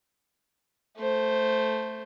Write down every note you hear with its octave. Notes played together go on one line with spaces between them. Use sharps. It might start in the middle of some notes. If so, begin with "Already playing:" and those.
A3 C5